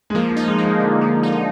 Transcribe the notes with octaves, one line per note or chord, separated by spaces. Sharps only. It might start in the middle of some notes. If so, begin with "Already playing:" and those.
G#3
F3 A#3
A#3
D#4
G#3
A#3
G#3
D3
F3
D#4